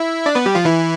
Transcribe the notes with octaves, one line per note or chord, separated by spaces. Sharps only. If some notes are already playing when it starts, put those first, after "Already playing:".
Already playing: E4 E5
D4 D5
B3 B4
G3 G4
F3 F4
E3 E4